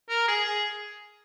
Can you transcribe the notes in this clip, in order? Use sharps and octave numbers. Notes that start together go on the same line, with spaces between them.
A#4
G#4
G#4